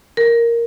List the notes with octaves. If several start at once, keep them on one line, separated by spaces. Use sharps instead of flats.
A#4